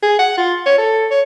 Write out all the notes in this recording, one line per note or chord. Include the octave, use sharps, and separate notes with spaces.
G#4
F#5
F4
C#5
A4
C#5